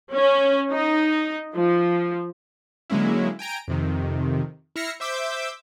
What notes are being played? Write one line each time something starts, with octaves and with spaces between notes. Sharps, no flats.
C#4
D#4
F3
D3 F#3 G#3 A#3 C#4 E4
G5 G#5 A#5 D7
F2 C3 D#3
E4 E5 F6 A#6 C7 C#7
C5 E5 D6 E6 G6